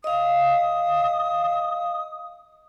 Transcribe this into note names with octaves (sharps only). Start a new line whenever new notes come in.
D#5 F5 D#6